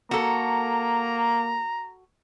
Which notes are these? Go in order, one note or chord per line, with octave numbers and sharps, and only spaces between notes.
A#3 F#4 A4 A#5